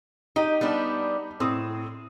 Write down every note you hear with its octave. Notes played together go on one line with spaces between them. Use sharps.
D#4 G4 D#5
G3 B3 D4
A2 C4 D#6